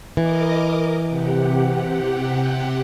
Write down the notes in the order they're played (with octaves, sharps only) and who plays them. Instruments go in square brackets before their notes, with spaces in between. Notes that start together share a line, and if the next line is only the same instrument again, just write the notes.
[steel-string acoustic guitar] E3 [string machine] A#4 D#5 D6
[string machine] C3 G4 F#5